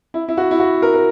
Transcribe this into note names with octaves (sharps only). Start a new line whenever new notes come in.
E4
E4
F#4
E4
F#4
A#4
A#4